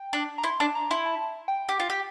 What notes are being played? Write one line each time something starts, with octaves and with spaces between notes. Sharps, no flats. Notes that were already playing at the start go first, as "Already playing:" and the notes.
Already playing: G5
D4
A#5
E4 C6
D4 A5
A#5
E4 C6
A5
G5
G4
F4
G4